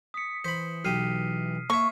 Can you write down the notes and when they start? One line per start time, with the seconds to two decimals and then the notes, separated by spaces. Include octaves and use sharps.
0.14 D#6 B6 C#7
0.44 E3 C5 B5 B6
0.85 B1 G4 D#6 F6 C7 D#7
1.70 A#3 C#5 E5 C#6